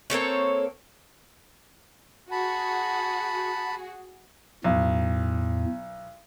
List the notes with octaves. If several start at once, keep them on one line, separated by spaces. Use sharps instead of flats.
A#3 C4 A4 C#5
F#4 G#4 A5 B5
B1 E2 A2